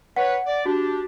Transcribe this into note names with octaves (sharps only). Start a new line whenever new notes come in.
B4 C#5 F#5
D5
D4 F#4 G4